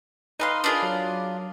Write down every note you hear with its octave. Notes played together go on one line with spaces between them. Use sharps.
D#4 B4 D#5 F5 A5 C6
D4 F4 G#4 A#4 B5 D#6
F#3